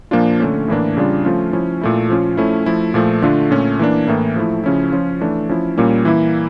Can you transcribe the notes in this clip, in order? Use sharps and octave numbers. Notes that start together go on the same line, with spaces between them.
A#2 F3 A#3 D4 F4
D3 A3 C#4
A2 E3 A#3 D4
C#3 G3 D4 F4
F3 A3 C#4 F4
F3 C#4 E4
A#2 A3 E4
F3 C#4 F4
F3 A3 C#4 E4
F3 A3 E4
A#2 F3 A3
D3 A3 D4 F4
A#2 A3 C#4
E3 A#3 D4
A2 E3 A#3 E4
F3 A3 E4
C#3 F3 C#4 E4
F3 C#4 F4
E3 A3 D4
F3 C#4 E4
A#2 G3 A#3 C#4
E3 A#3 E4